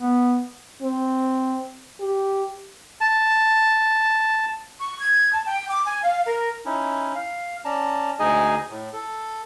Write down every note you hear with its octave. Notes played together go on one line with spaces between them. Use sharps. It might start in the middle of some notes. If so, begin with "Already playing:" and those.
B3
C4
G4
A5
C#6
G#6
A5
G5
D6
G#5
F5
A#4
C#4 D#4 E4
F5
C#4 D5 A5 A#5
D2 D#4 G#4 D#5 G#5
A2
A4